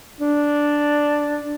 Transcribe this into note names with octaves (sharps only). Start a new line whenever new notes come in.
D4